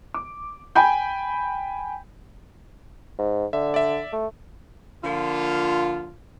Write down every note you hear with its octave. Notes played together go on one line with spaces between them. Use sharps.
D6
G5 G#5 B5 G6
G#2
D3 E5
D5 E5
A3
D3 F3 A#3 F4